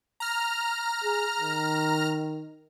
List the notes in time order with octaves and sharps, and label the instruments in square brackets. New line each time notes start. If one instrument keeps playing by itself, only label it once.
[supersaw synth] A#5 F6
[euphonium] G#4
D#3